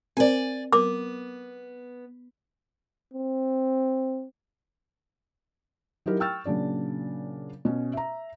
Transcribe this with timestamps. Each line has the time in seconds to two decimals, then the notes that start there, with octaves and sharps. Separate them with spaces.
0.17 C4 A#4 C5 D5 G#5
0.73 B3 A#4 D6
3.14 C4
6.06 F#3 D#4 E4 G4 A#4
6.20 G5 C#6 E6 F6 A6
6.45 A#2 C#3 F#3 D4 D5
7.65 B2 C#4
7.93 E5 A#5